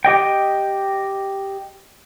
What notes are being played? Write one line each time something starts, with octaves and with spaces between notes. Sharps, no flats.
G4 D#5 G5